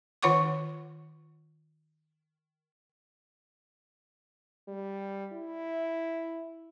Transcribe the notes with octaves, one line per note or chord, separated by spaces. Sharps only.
D#3 F4 C#5 F#5 C#6 D6
G3
E4